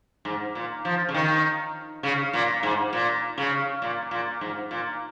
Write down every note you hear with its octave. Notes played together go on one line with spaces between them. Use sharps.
G#2
A#2
F3
C#3
D#3
C#3
A#2
G#2
A#2
C#3
A#2
A#2
G#2
A#2